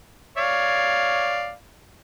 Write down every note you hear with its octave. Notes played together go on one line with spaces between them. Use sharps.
C#5 D5 F5